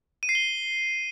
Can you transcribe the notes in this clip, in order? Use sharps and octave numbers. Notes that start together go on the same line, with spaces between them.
D#7
C7
G7